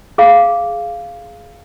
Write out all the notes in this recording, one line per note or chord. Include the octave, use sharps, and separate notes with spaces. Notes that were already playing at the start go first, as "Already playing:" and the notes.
G#4 F5